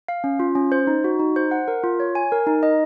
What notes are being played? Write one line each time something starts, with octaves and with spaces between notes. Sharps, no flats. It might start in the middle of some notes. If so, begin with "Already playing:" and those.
F5
C#4
F4
C#4
C5
D#4
F#4
D#4
C5
F#5
A#4
F4
C#5
G#5
A#4
D#4
D#5